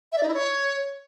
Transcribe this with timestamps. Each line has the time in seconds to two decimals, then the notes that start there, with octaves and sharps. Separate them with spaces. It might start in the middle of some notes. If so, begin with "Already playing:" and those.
0.12 E5
0.18 D5
0.23 D#4
0.28 E4
0.34 C#5